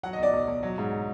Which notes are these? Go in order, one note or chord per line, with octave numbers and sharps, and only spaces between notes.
F#3 F#5
D#5
B1 D5
B1
B1
F#3
G#2
F#3